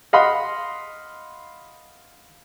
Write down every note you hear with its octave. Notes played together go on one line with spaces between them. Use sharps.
D#5 F5 F#5 B5 C6